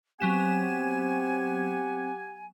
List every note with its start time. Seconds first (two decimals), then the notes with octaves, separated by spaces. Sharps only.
0.20 F#3 B3 C4 G4 F#5 G#5 E7